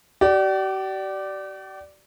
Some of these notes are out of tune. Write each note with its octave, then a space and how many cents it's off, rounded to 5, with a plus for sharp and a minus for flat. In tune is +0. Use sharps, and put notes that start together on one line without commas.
G4 -45 D5 +0